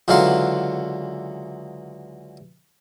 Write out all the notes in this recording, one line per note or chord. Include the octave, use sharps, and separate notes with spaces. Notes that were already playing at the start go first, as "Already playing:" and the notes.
C#2 D3 E3 F#3 F5 C6